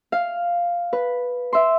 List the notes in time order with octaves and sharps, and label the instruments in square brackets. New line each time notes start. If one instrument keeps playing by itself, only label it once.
[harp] F5
B4
E5 C6